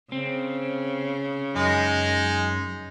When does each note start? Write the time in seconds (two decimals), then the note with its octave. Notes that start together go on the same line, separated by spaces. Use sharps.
0.12 C#3 C4
1.56 F#2 G#3 D#4